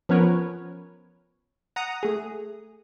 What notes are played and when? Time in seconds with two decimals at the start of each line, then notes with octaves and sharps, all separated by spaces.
0.09 F3 B3 C#4 A#4 B4 C#5
1.76 F#5 A#5 D#6
2.03 A3 G#4